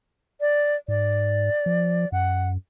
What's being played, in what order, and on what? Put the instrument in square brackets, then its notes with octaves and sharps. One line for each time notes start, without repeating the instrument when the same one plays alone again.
[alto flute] D5
[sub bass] G#2 [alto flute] D5
[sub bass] F3
[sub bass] F#2 [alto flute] F#5